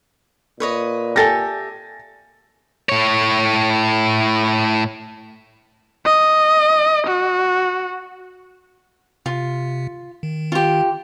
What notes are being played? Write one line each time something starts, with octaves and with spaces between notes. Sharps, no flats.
A#2 B4 C#5 D#5
G4 A4 E5 G#5 A6 A#6
A2 C#5
D#5
F#4
C3 F4
D#3
F4 G4